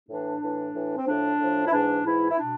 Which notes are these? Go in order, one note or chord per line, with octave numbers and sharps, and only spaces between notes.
A2 E3 D4
A2 E3
A2 E3
C4
A2 F3 D4
A2 F3
E4
G#2 E3 D4
G#2 E3 E4
E4
B2 D4